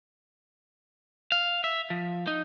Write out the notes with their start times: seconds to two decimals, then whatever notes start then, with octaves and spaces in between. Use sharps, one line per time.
1.32 F5
1.64 E5
1.90 F3
2.27 D#4